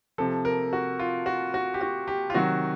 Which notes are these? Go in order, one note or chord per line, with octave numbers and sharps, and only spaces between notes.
C3 F3 A4
A#4
F#4
F4
F#4
F#4
G4
F#4
G4
F4
C3 D#3 F#3 F#4